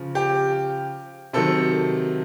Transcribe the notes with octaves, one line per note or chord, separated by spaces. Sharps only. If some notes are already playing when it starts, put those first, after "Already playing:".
Already playing: C#3 F3
G4
C3 D#3 F#3 A4